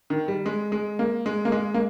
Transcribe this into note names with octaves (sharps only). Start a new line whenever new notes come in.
D#3
G3
G#3
G#3
A#3
G#3
A#3
G#3
A#3